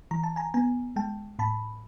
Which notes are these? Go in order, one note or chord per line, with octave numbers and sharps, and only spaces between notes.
E3 A#5
A5
G#5 A#5
B3 G#5 A#5
G#3 G5 A5
A2 A5 B5